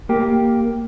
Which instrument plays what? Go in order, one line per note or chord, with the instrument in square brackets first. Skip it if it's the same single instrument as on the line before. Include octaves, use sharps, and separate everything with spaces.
[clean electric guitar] A#3 G4